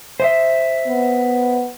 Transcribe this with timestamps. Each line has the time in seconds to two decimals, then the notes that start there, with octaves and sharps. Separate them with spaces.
0.20 C5 D#5 E5
0.87 B3